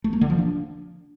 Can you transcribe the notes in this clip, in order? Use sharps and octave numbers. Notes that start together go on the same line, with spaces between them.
A3
A#3
D3
F3
D4